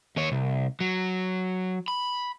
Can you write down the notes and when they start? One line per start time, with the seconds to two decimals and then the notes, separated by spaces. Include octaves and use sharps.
0.16 D#2 C#5
0.32 C2
0.80 F#3
1.88 B5